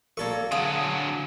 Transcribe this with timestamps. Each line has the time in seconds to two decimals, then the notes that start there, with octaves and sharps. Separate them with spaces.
0.17 A#3 A4 A#4 D5 C#6
0.52 D3 F#3 G#4 F5